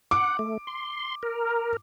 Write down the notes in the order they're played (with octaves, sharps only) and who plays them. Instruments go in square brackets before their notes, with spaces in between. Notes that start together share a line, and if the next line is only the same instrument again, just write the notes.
[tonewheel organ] F#5 [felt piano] D6
[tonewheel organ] A3
C6
A#4